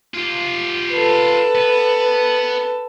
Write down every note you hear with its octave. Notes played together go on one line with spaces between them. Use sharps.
F4 G4
A4 B4
B3